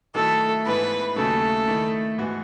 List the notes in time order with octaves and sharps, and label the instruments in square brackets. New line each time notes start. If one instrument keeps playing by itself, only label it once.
[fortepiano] D#3 F#3 A3 E4 [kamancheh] A4
[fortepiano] G#2 E3 B3 E4 [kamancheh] B4
[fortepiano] D#2 C#3 F#3 A3 [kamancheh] A4
[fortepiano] D#3 A3 E4
G#2 E3 B3 F#4